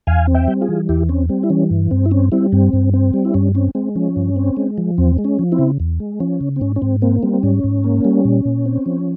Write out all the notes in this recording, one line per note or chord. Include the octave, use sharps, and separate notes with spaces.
E2 F5 G#5
C4
E5 G5
G3
F4 G#4
E3
E2 E4 G4
C4 C#4
G3 C4
E4
E3 C#4
G2
G2 C4
E4
C4 C#4
G3 C4 E4
G2 C4
G2
C4
G3
E4
G2 C#4
C4 C#4
G#3 C4
F3 C#4
G2
C4
G#3
F3
E2 C4
G#3
C#4
F3
C4 E4
C#3
E2
G#3
F3 C#4
C#3
C4
G#2 C#4
C#4
G#2 C4
A#3 C4
G3 C4
C4
G#2 C#4
G#2
A#3
G3
A#2
A#2
C4
F3